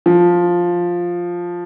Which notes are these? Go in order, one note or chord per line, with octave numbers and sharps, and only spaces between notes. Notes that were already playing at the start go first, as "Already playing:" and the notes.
F3